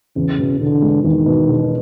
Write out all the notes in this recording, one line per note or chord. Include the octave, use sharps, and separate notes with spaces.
E2 C#3
B2
E1 D3
G#3
E2 D#3
B2
E1